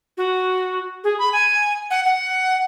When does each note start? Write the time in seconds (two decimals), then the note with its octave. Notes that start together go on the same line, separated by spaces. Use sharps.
0.17 F#4
1.04 G#4
1.19 B5
1.33 G#5
1.91 F#5
2.05 F#5